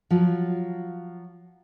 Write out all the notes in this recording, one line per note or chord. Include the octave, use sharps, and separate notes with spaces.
F3 F#3 F4 F#4